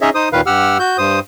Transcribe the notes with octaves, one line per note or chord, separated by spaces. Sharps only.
C#4 D#4 G#4 C#5 D#5 E5
D#4 C5 D#6
D#2 A#2 D#3 B4 F5
G2 G4 F#5 E6 F6
F#4 G6
G2 C5 D#6